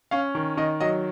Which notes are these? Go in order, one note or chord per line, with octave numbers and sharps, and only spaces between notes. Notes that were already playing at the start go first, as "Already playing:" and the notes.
C#4 F5
D#3
D#3 D#5
F#3 D#5